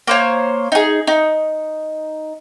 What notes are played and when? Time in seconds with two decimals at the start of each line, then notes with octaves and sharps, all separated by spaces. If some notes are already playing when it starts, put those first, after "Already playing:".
0.07 A#3 C5 C#5
0.72 D#4 G#4
1.07 D#4